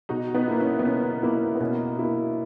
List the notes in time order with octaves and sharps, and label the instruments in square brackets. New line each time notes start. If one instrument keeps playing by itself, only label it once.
[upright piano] B2 [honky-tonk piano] D#4 F#4
[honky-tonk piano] B3 D#4
[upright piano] A#3 E4
[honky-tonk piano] C#4
B3
[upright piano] B2 [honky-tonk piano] C#4
[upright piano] A#3 E4 [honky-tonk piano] B3 D#4
[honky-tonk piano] B3
[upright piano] B2 [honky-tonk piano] C#4
[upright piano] A#3 E4